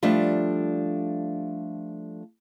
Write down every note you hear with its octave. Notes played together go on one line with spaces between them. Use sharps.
F3 G3 A3 D4